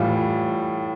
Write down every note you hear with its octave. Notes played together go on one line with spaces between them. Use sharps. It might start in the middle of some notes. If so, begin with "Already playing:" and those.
Already playing: A2 E3 G3 F4